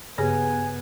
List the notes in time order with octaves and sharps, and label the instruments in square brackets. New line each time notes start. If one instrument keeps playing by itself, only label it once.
[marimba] G2 C#3 G#4 [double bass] B3 [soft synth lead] G#5